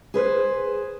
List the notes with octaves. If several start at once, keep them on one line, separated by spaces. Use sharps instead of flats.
G#4 B4 C5